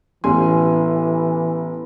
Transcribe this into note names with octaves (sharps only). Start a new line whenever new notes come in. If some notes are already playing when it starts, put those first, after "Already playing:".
A1 E3 B3 G#5 C6